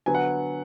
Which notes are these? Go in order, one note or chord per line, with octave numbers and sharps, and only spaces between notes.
D3 F#3 B3 G#5
F#5